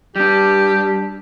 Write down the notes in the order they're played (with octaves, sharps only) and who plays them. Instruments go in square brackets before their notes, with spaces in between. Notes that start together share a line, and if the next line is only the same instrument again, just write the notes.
[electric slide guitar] G3 D4 [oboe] G4